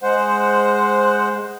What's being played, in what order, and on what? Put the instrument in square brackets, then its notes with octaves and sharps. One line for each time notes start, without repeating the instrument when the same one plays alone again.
[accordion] G#3 C5 F#5